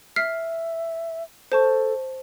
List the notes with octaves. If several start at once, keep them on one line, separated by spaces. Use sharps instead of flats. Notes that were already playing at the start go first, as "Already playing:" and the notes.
E5 F6 B6 C7
A4 C5 A5 C#6